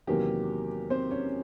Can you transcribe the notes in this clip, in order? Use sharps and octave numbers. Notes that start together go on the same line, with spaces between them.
E2 C3 D#3 F#3 A#3 G4
C4 C5
C#4 C#5